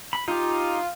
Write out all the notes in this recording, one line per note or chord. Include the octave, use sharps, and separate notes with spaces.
B5
D#4 F4 G4